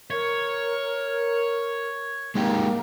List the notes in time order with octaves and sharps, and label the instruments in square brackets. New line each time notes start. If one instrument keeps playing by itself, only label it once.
[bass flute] A#4 [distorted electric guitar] C#5
[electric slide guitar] G#3 D#4 G4 [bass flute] A#3